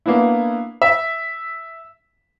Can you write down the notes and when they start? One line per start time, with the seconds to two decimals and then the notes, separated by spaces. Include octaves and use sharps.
0.06 A#3 B3 D4 E4
0.82 E5